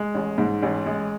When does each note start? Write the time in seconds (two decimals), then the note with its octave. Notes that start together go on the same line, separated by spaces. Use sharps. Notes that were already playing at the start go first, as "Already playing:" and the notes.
Already playing: G#3
0.15 A1
0.38 G#2
0.62 A1
0.86 G#3